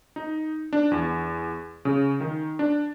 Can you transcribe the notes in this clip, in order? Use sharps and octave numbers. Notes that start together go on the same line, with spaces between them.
D#4
D4
E2
C#3
D#3
D4